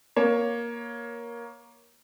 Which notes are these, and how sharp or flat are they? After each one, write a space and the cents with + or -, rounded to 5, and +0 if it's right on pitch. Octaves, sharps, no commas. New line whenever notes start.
A#3 +15 C#5 +5